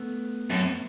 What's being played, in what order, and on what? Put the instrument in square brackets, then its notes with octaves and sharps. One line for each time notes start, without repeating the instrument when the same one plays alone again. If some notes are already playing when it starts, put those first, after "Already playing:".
Already playing: [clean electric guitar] A3 B3
[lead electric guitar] F#2